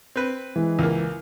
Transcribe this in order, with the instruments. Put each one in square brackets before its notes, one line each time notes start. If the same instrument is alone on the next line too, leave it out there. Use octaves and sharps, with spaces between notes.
[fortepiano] C4 B4
[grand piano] E3 G#3
[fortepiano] C#2 A#3